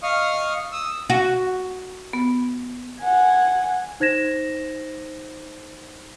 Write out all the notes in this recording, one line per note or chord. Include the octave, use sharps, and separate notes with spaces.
D#5 F5 C#6 D#6 F6
D#6 E6
F#4
B3
F#5 G#5
D#4 C5 G#6 A#6 E7